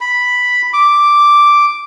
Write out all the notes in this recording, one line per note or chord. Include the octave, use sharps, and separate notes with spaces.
B5
D6